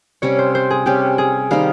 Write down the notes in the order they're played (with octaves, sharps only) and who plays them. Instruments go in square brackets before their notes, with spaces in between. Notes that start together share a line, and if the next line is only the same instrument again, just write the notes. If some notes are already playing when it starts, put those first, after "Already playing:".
[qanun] C3 G3 C#4 [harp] C#5
[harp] C5
C5
G#4
[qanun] C3 G3 C#4 [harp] G4
[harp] G#4
[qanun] D#3 G3 C4 D#4 [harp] F5